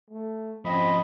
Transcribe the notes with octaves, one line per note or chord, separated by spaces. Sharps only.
A3
F3 C4 C#4 D#5 B5